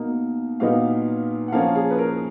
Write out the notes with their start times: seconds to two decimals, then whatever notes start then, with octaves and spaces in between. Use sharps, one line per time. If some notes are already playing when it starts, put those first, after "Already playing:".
Already playing: B2 A#3 D#4
0.60 A#2 F#3 B3 D#4 F5
1.48 F#5
1.52 F3 A#3 C#4 F5
1.75 G#4
1.90 B4
1.98 A#4